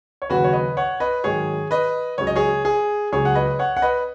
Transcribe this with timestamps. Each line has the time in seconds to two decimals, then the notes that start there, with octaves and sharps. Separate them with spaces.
0.22 C#5
0.30 D#2 C#3 F#3 F#4 B4
0.44 C#5
0.53 B4 D#5
0.77 C#5 F#5
1.00 B4 D#5
1.24 G#2 D#3 F#3 G#4 C#5
1.71 B4 D#5
2.18 C#2 C#3 F#3 C#5
2.27 D#5
2.36 G#4 C#5
2.65 G#4
3.12 C#2 C#3 F#3 G#4 C#5
3.25 F#5
3.35 B4 D#5
3.59 C#5 F#5
3.77 F#5
3.82 B4 D#5